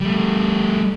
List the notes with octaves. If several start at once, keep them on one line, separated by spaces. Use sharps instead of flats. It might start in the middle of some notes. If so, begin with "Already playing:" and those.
G3 A3